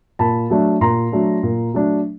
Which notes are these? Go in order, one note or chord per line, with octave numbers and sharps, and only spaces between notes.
A#2 A5 B5
F#3 A3 D4
A#2 A#5 C6
F#3 A3 D4
A#2
F#3 A3 D4